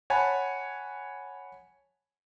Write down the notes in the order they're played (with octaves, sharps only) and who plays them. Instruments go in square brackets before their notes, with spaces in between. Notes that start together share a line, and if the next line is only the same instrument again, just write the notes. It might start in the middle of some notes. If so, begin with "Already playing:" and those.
[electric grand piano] C#5 F#5 G#5 A5 B5